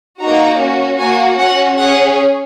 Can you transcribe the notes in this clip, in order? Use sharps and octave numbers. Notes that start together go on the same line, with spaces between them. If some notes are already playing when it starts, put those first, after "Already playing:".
A#3 D#4 F#4 A#5
C#4 F#4
A#3 F#4 G#5
C#4 F#4 F#5
C#4 G#4 F#5